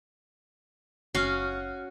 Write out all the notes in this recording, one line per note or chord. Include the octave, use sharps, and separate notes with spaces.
F#1 C#4 F#4 F5